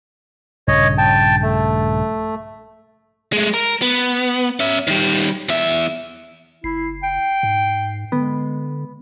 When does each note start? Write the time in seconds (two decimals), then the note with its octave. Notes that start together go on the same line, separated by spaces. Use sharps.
0.68 A#1 G2 C#3 C#5 D#5
0.98 G5 A5
1.42 A3
3.33 G#3 A3
3.54 A#4
3.82 B3
4.60 C#4 E5
4.88 D#3 G3
5.49 E2 E5
6.64 F#1 E4 C7
7.03 G5
7.43 G#2
8.12 D3 G#3 B3